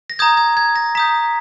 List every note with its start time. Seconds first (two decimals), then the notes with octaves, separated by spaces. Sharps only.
0.10 A#6
0.19 A#5 D#6 G6 G#6
0.37 G#6
0.57 G#6
0.76 A#6
0.95 A#5 D#6 G6 B6